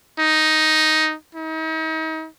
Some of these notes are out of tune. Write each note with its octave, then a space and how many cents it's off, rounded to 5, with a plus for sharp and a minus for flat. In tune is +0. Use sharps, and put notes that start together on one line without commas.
D#4 +5
D#4 +40